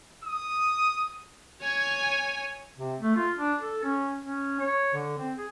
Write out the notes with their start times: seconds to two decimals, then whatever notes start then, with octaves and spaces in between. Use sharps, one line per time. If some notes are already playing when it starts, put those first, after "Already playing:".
0.24 D#6
1.62 C#5 G#5
2.77 C3
3.00 A3
3.16 F4
3.38 D4
3.61 A4
3.83 C#4
4.23 C#4
4.59 C#5
4.94 D3
5.17 C4
5.38 G#4